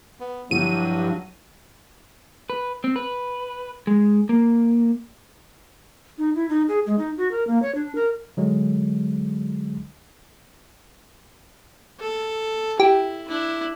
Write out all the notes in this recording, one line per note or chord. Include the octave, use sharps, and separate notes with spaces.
B3
G1 G2 F3 F#3 E4 D#7
B4
C4
B4
G#3
A#3
D#4
E4
D#4
G#4
G#3
D#4
F#4
A#4
A#3
C#5
D4
A#4
D3 F#3 G#3
A4
E4 G4
D4 E4